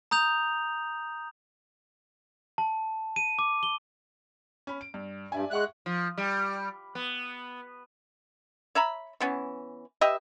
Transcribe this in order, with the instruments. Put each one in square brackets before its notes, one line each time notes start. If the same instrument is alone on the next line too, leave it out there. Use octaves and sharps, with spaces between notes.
[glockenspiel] A#5 D#6 G6 F7
A5
D#7
D6
G7
[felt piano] C#4 B5
D7
G2
[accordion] G2 [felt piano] D5 E5 G#5
[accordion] G#3 F#6 [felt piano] E5 F#5 C#6
[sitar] F3
G3
B3
[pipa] C#5 E5 A#5 B5
E3 B3 C#4
G4 B4 D#5 E5